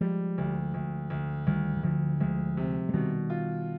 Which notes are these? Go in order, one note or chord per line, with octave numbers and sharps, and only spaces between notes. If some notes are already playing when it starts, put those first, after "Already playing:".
F3 G3 G#3
D2
D2
D2
D2 D#3 G3
D#3
D2 D3 F3
D2 F3 G#3
C3
G#3
B2 D#3 G3
F4